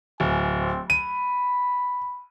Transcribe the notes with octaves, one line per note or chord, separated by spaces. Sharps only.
D1 G#5
C4
B5 D#7